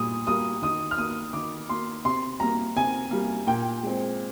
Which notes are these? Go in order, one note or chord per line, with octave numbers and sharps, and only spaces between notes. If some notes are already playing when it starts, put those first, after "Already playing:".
Already playing: A#2 G3 A#3 D#6
G3 A#3 D#6
D#3 D#6
F6
A#3 D#6
D#3 D6
A#3 C6
C3 C6
G3 A#3 A#5
C3 G#5
G3 A#3
A#2 G5
G#3 C4